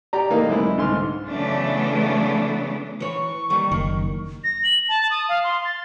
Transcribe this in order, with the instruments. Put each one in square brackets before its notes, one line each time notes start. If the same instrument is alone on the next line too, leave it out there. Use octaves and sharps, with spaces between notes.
[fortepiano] G4 D5 A#5
E3 A3 A#3 D#4
B1 G#3 C4 E4
C2 G#2 D3 C6 F6
[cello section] C#3 E3 F#3 A3 B3 D4
[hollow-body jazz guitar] E3 C#5 [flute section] C#6
[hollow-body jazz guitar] D#2 D#3 G3
[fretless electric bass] F#1 [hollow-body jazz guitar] D#3
[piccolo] A#6
F#7
A5
D#6
F5
C6
A6